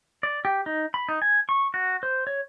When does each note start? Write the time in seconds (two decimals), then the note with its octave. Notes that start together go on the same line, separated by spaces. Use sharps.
0.23 D5
0.45 G4
0.66 D#4
0.94 B5
1.09 D#4
1.22 G#5
1.49 C#6
1.74 F#4
2.03 C5
2.27 C#5